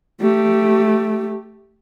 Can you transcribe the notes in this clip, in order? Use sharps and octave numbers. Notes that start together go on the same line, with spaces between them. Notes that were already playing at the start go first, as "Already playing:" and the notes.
A3 G4